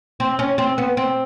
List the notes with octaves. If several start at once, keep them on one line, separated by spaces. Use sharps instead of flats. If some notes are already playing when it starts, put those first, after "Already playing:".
C4
C#4
C4
B3
C4